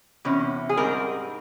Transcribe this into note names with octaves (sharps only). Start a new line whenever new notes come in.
E2 C3 C#4
G#4
G#2 G3 C4 A#4